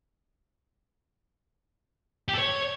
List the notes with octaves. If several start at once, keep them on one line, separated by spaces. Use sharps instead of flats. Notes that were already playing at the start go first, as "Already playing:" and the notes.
G4
A4
C#5